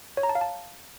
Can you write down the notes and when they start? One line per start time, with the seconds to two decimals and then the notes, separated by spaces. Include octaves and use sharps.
0.17 C#5
0.23 A#5
0.29 A5
0.35 F5
0.41 A5